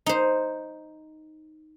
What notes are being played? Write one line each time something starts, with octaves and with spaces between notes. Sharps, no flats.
D#4 C5